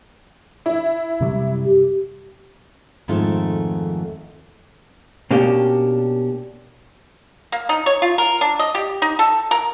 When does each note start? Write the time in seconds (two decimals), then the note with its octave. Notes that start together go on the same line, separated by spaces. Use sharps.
0.66 E4
1.21 F#2 C3 G3
1.65 G4
3.08 F2 G#2 D#3 A3 F4
5.31 B2 A#3 C#4 D4 G4
7.52 A#3
7.69 D#4
7.86 C#5
8.02 F4
8.18 A#4
8.41 D4
8.59 D#5
8.75 G4
9.02 D#4
9.19 A4
9.51 A#4